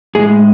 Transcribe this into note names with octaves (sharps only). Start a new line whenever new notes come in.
A2 G#3 G#4